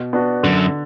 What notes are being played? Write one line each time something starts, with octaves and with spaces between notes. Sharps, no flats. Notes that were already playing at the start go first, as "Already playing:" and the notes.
Already playing: B2
B3 D4 F#4
F#2 D3